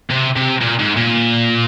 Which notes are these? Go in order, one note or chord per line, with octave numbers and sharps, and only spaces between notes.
C3
C3
A#2
G#2
A#2